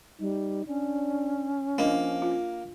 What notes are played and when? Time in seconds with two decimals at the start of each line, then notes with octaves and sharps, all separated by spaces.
0.20 G3 D#4
0.67 C#4 D4
1.78 F3 A#3 D4 D#5
2.22 F4